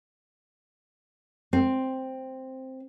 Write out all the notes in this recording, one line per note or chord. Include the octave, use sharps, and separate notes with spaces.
C4